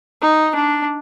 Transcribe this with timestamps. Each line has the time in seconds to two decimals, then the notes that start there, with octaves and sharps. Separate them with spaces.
0.22 D#4
0.55 D4